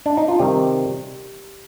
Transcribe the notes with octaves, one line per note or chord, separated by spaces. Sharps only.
D4
D#4
F4
C3 D#3 G3 G4